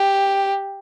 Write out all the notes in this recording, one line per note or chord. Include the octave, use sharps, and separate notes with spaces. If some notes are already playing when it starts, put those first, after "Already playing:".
Already playing: G4